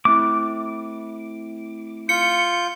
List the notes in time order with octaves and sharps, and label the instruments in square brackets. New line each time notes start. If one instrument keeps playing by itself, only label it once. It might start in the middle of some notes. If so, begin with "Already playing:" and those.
[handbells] A3 C4 E4 [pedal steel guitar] D6
[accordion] F4 G6 [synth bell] C#7